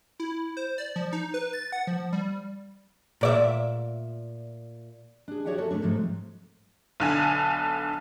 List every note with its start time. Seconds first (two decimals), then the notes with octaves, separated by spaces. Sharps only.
0.20 E4
0.57 C5
0.78 D5
0.96 F3
1.13 D#4
1.34 B4
1.53 A6
1.72 F#5
1.87 F3
2.13 G3
3.21 A#2 D5 E5
5.28 D4 G#4
5.45 F#4 C#5 D5 E5 F#5 G5
5.58 A#3 F4 F#4 G#4 A4
5.71 F2 D3 A3 C4 D4
5.82 G#2 C3 F3 F#3 A3
7.00 B1 D3 G#5